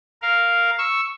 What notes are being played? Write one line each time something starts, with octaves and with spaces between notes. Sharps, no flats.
A#4 F5
C#6 E6